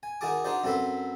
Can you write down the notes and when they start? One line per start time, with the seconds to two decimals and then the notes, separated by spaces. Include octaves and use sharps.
0.03 G#5
0.21 D#3 F#4 G#4 G#5 A5 D6
0.44 D4 D#4 F#4 C5 D5
0.64 F#2 C4 F#4 A4 B4 B5